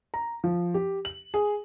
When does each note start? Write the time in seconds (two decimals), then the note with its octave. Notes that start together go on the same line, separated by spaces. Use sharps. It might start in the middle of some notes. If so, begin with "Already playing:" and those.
0.14 A#5
0.44 F3
0.74 G4
1.05 F#7
1.34 G#4